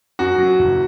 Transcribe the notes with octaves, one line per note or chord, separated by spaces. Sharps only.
F#2 F#4
F#3
F#1